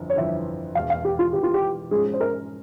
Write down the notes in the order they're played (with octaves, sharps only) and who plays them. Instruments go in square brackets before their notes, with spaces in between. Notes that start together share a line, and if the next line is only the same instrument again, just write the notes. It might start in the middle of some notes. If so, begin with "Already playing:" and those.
Already playing: [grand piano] G1 F2 E3
[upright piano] C#5
[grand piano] G1 F2 E3 [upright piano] E5
[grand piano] E1 E2 E3 [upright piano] F5
[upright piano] F5
G4
F4
[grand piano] E1 E2 E3 [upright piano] G4
[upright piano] F4
G4
[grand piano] G#2 F3 G#3 C#4 [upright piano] G#4
[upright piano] C5
A#4